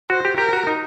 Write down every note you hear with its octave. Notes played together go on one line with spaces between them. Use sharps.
F#4 C5
G4
G4 A#4
F#4
D#4